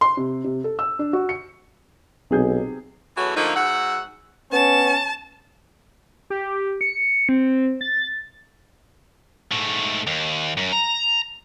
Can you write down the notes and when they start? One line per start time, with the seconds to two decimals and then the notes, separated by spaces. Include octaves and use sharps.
0.01 C6
0.17 C3
0.44 C3
0.64 A4
0.79 E6
0.99 D4
1.13 F#4
1.29 C#7
2.31 B1 C3 G#4 G6
3.17 E2 E3 F#3 C#4 F#4 A4
3.36 D3 F3 A3 A#3 D#4
3.56 G#2 F#4 E5 F#5
4.52 B3 C#4 A5
6.30 G4
6.81 C#7
7.29 C4
7.81 A6
9.52 G#2 A3
10.07 D#2
10.57 F#2
10.73 A#5